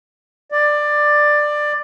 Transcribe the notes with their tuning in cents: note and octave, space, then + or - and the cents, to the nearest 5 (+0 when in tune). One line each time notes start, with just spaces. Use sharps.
D5 +15